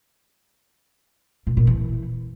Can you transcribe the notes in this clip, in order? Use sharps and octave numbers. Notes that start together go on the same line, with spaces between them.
A#2
A#2
E3